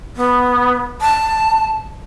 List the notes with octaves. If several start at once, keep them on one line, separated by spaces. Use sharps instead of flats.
B3
A5